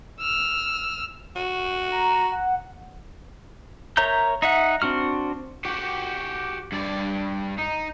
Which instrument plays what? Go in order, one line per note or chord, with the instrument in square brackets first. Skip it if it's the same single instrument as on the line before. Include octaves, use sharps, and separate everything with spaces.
[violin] E6 F6
[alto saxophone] F#4
[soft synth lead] A#5
F#5
[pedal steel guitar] A#4 C#5 E5 A#5 G6
D#4 E5 F#5
C4 D4 F#4 F6
[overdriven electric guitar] F#4 G4
G2 D5
D#4